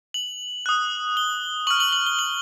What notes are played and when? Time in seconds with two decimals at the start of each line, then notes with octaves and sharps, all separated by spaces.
0.14 F#7
0.66 D#6 F#6
1.17 G7
1.67 C#6 F6 F#7
1.80 F#7
1.92 F#7
2.06 G7
2.19 F#7